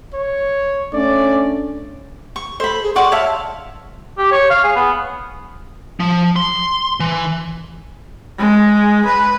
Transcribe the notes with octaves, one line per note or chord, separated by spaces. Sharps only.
C#5
A3 C#4 D4 D5
C#6
A4 C5 B5
G#4
D5 F#5 C6 C#6
C#5 E5 F5 A5
G4
C#5
F5
G#4
B3
F3
C6
E3
G#3
B4